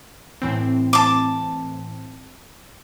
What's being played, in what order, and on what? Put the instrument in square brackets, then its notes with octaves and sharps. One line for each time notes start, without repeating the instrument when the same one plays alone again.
[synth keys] A2 E3 C4
[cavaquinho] A5 D6